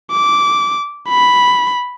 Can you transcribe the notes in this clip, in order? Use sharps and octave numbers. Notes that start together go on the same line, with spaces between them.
D6
B5